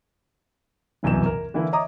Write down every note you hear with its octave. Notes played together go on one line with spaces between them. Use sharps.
D1 C2 F#2 B2 E3 E7
A#4
D3 E3 A#3 E4
C#5 D#5 E5 A#5 D6 D#6